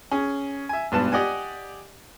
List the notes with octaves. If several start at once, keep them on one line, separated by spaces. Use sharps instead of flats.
C#4 G#4
E5 G#5
G#1 G2 B2 B4 A5
G4 D5 D#5 F#5 G#5